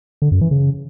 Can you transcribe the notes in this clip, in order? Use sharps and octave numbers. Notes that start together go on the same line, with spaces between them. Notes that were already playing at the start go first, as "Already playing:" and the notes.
D3
F#2
E3
C#3